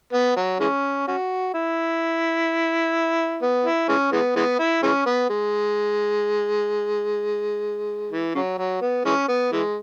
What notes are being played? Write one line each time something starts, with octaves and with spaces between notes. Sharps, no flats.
B3
F#3
E3 G#3 C#4
C#4 F#4
E4
B3
E4
E3 G#3 C#4
E3 G#3 B3
E3 G#3 B3
E4
E3 G#3 C#4
B3
G#3
E3
C#3 F#3
F#3
B3
E3 G#3 C#4
B3
E3 G#3